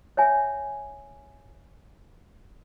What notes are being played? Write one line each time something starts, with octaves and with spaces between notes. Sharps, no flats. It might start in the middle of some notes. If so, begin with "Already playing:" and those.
C#5 E5 G#5